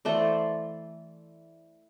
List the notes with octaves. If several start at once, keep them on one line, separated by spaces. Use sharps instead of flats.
E3 A3 C5 D5